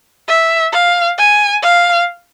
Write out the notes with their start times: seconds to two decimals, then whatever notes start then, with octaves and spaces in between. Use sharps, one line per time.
0.28 E5
0.72 F5
1.18 G#5
1.62 F5